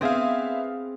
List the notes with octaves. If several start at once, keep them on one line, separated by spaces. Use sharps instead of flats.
B3 C4 G#4 E5 F5